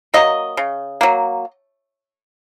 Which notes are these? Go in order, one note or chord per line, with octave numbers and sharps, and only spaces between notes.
F#3 A#3 D#5
C#3
F#3 A#3